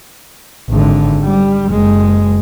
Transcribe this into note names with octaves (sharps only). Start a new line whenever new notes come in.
G#1 D3
G3
F#1 G#3